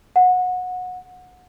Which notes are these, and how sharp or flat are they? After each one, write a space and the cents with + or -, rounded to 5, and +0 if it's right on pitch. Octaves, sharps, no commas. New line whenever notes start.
F#5 -20